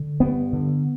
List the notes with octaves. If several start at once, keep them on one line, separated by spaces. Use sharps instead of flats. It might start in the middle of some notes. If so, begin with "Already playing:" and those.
Already playing: D3
G2 B3
D3